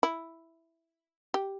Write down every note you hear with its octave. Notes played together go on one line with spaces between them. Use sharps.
E4
G4